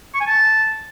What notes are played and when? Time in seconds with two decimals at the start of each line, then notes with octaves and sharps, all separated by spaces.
0.14 C#6
0.21 G#5
0.27 A5